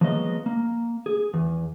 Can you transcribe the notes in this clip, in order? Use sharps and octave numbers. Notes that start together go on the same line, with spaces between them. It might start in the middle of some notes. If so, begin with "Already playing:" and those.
F3 F#3 G#3 A#3 B3 D#5
A#3
G#4
E2